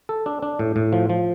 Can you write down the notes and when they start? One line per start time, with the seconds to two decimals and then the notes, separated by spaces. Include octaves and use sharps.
0.09 A4
0.26 D4
0.42 D4
0.59 A2
0.76 A2
0.93 F3
1.09 F3